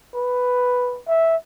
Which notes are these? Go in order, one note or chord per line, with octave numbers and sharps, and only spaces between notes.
B4
E5